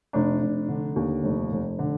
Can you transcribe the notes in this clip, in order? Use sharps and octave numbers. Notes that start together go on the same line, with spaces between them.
F1 D4
F1
D3
D#2
F1
F1
D3